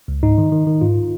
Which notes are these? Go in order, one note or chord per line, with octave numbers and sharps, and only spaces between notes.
C#2
G#2 D#4
D#3
D#3
D#3
G#2 F4